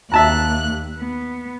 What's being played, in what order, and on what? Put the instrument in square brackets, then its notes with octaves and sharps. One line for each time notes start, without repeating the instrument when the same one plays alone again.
[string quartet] D#2 F#6 [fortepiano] E5 A5 A#5
[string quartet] B3